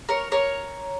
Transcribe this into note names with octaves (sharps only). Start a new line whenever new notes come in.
A#4 C#5
A#4 C#5